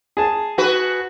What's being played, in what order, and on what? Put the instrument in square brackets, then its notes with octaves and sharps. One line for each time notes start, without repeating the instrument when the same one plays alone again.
[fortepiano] G#4 A5
[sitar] F#4 B4